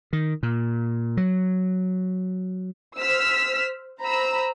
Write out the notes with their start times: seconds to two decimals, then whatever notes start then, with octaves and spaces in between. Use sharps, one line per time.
0.13 D#3
0.43 A#2
1.17 F#3
2.96 C5 E6 F6 B6
4.01 C5 A#5 B5 E6